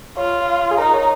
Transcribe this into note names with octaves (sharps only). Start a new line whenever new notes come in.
F4 C#5
G#4
D#4 A#4
C#5